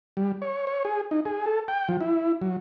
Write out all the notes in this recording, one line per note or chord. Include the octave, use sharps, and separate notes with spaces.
G3
C#5
C#5
G#4
D#4
G#4
A4
G5
F3
E4
F#3